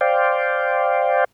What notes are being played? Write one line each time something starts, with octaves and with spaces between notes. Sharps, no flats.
C5 D5 F5 G5